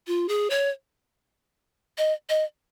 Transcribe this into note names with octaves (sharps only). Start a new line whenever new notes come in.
F4
G#4
C#5
D#5
D#5